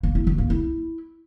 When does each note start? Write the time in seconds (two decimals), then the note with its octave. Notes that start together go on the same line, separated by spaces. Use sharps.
0.03 A#3
0.15 E4
0.27 F#3
0.38 A#3
0.50 E4